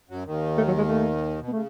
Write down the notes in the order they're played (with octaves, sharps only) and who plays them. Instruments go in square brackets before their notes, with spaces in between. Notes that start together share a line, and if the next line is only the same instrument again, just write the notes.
[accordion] F#2 F#3
D#2 D#3
[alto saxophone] A3
F#3
G#3
A3
[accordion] B2
[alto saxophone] B3
[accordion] C#3 [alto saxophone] A3